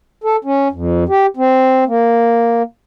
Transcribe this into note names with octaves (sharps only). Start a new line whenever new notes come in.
A4
C#4
F2
G4
C4
A#3